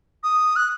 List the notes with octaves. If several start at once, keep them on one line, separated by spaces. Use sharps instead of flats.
D#6
F#6